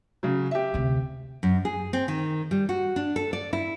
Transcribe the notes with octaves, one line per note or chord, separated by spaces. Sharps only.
C#3 F#3
G4 E5
D2 C3
F#2
G#4
C4
D#3
G3
F#4
D4
A4
D5
E4